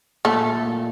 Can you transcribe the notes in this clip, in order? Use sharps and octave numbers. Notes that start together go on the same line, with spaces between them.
A#2 A3
A#2
A#2